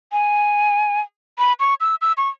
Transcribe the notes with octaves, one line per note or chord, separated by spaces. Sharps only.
G#5
B5
C#6
E6
E6
C#6